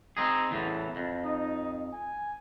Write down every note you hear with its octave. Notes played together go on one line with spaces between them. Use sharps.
C4 D#4 G#4
E2 A2 E3
F2
D#4
G#5